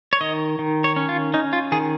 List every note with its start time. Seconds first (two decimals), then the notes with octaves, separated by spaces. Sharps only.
0.13 C#5
0.21 D#3 D#5
0.59 D#3
0.84 C#5
0.96 C#4
1.09 F4
1.34 C#4 D#4
1.53 F4
1.72 D#3 G#4